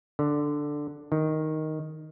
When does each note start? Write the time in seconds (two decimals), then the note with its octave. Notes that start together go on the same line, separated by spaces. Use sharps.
0.19 D3
1.12 D#3